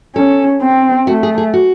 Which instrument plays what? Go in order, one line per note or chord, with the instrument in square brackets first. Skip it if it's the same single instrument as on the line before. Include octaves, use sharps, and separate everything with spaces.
[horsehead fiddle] C#4 [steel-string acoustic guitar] A4
[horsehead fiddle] C4
[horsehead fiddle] A3 [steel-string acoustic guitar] F#4
[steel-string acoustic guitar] G#4
G#4
F#4